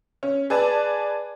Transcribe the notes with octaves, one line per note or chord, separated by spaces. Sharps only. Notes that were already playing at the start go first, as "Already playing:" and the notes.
C#4
G#4 B4 D5 A5